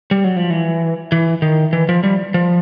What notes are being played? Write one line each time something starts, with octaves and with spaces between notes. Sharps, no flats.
G3
F#3
F3
E3
E3
D#3
E3
F3
G3
F3